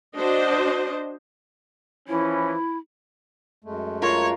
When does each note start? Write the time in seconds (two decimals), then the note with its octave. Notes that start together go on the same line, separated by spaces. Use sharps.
0.17 D4 F#4 C5 D#5
2.08 E3 F3 C#4 E4
3.64 F#2 G#3 A3
4.02 F4 A#4 C#5